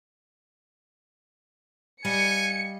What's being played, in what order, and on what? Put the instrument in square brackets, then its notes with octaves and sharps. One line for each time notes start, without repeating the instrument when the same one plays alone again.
[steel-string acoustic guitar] G3 D#5 F5 [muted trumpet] G#5 [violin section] C#7